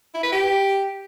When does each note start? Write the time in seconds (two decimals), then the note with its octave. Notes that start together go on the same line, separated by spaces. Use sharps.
0.14 E4
0.23 B4
0.32 G4